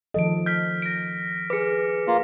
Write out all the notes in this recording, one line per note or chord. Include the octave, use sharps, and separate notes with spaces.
D#3 F3 A4 D#5 D7
F6 G6 B6
A#6 D7
G#4 B4 D6 C#7
A#3 F4